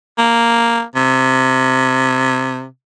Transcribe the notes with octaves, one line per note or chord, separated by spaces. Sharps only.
A#3
C3